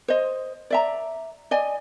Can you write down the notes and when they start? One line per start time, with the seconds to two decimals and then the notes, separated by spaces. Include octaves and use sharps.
0.08 C5 D#5
0.70 D5 E5 A#5
1.51 D5 D#5 G#5